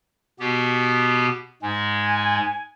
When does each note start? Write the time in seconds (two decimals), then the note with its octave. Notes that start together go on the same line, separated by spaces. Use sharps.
0.40 B2 B3 G4
1.62 G#2 G#3 G#5